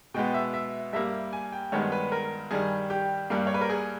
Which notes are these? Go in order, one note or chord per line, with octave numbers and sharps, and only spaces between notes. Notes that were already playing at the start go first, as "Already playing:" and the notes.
B2 G#3 B3 G5
E5
E5
G2 G3 A#3 E5
G#5
G5
G2 D#3 G#3 B3 C#5
B4
A#4
G2 D#3 G3 G#4
G4
G2 G3 A#3
C#5
B4
A#4
G#4